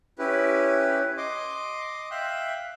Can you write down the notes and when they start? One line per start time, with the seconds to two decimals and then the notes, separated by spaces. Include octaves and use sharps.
0.19 C#4 E4 G4 B4
1.17 D#5 C6 D6
2.11 E5 F5 G5 F#6